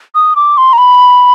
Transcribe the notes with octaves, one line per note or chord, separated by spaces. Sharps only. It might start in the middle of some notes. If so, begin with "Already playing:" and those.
D#6
D6
C6
A#5
B5